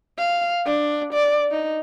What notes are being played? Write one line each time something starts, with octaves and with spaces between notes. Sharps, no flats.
F5
D4
D5
D#4